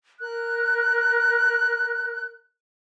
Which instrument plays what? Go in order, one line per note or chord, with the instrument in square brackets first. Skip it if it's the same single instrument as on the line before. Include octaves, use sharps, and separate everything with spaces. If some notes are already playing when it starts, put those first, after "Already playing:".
[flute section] A#4 F#6